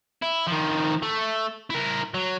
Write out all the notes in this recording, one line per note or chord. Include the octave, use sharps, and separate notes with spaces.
E4
D#3 F3
A3
E4 A#4
F#3